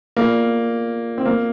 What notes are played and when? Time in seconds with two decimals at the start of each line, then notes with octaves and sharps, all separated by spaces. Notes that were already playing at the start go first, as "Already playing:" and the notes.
0.17 A#3 F4 G#4 D5
1.18 C4
1.26 A#3